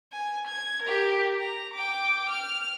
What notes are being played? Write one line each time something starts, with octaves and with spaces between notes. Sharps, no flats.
G#5
G#6
G4 A#4
A#5
G5 D6
F6